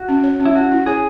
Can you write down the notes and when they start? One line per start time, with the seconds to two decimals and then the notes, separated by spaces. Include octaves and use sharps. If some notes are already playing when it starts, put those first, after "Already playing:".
Already playing: F#4
0.08 C#4
0.24 C#5
0.40 C#4
0.45 E4
0.55 C#4 F#4
0.72 E4
0.86 G#4 C#5